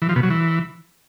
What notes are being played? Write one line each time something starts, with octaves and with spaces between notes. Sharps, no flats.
E3
F3
B2
F#3
E3